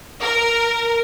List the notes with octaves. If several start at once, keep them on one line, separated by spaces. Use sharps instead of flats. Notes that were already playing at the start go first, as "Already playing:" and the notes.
A#4